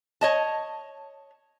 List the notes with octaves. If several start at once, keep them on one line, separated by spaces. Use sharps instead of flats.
C#5 D#5 A5